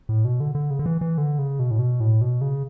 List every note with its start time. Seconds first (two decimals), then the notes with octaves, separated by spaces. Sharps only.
0.09 A2
0.25 B2
0.40 D3
0.55 D3
0.70 C#3
0.79 D3
0.86 E3
1.01 E3
1.18 D3
1.39 C#3
1.59 B2
1.71 A2
1.79 B2
2.00 A2
2.21 B2
2.41 C#3